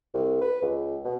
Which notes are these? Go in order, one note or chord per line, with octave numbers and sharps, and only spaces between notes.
C2
B4
C#2
B2